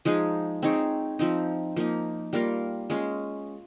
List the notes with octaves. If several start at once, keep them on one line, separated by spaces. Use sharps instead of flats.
F3 G#3 D#4 G#4
C4 D#4 G#4 C#5
F3 C4 D#4
F3 A#3 D#4
G3 A#3 F4 A#4
G#3 C#4 F4